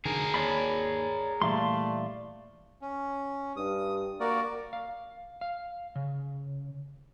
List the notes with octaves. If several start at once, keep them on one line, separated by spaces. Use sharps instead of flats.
F1 D3 D#3 G#4 A#4
D#2 C#5 D5 B5
A#2 E3 G3 A3 D5 F5 C6
C#4
G2 D#6
A#3 F#4 A#4 D5
F5
F5
C#3